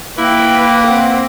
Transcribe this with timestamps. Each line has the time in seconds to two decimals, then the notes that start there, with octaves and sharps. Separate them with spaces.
0.18 A#3 E4 B4 G5
0.87 C4 F#5